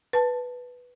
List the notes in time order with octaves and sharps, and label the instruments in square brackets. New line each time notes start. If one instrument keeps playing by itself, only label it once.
[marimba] B4 A5